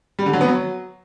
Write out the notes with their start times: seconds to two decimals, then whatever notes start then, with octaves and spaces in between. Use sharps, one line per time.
0.19 G3
0.26 D3
0.33 F#3
0.41 B3
0.48 F#3